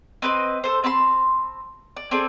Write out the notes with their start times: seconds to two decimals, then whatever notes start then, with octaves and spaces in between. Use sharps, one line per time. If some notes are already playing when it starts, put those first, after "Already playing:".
0.22 C4 B4 C5 D#5
0.64 A4 C5
0.84 C4 A5 B5 C6
1.96 D5
2.11 C4 G#4 A4 D5